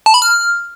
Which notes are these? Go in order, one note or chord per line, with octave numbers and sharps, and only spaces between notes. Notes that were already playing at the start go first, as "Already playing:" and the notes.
A5
B5
F6